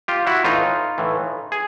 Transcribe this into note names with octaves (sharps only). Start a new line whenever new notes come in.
F4 G4
E4 F#4
A2 E3 D#4 F4
A2 E3
G#4